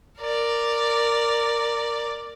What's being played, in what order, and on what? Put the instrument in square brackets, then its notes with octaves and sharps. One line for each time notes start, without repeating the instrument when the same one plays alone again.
[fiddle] A#4 D5